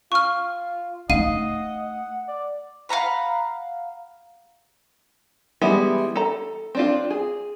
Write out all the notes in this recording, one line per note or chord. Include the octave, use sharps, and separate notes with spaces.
F4 C#6 F6
A3 D#4 D#5 F5 F#5 D#7
D5
F5 F#5 A#5 B5
E3 G3 G#3 B3 E4
A4 A#5
C4 D4 F4
G#4